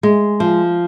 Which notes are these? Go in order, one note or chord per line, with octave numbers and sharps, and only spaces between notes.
G#3
F3